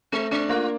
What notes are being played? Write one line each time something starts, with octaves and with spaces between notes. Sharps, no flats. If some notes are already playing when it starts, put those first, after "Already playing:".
A3 C4
C4 D4
A#3 F4